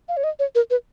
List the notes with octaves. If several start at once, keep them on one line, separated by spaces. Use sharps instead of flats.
F5
C#5
D#5
C#5
A#4
B4